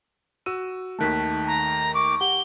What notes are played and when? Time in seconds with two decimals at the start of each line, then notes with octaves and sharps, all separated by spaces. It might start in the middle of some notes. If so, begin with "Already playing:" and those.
0.46 F#4 E6 D#7
0.99 D#2 D#3 A3 A5 F#6 B6
1.47 A#5
1.94 C#6 D6
2.21 G4 F#5 G7